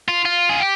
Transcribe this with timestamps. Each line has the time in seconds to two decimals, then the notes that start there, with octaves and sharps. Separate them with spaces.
0.08 F4
0.25 F4
0.49 G#4
0.60 G4